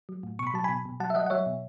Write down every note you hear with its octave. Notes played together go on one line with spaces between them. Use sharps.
F#3
A2
B2 C#6
B5
F#3 A5
B2 G#5 B5
B2
F#3 F#5 A5
E5
F#3 D#5 F#5
F#5
F#3 C#5 E5
B2